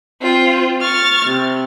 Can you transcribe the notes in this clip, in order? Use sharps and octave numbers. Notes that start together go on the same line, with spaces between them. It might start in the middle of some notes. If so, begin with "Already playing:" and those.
C4 F4
C#6 F6 A6
C3